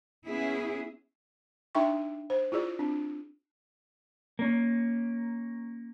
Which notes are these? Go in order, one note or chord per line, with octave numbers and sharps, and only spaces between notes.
B3 C#4 E4 G#4
D4 D#4 E5 G5 C#6
C5
E4 F4 G#4 D5
C4 D4
A#3 C#4